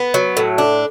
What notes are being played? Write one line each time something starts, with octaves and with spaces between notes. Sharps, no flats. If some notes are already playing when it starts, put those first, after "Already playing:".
Already playing: B3
F#3
A2
D4